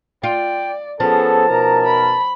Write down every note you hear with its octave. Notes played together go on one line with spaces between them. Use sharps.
F4 D5 G5
F3 B3 C#4 G#4 A4 A5
B2 D#4 A#4 A#5
B5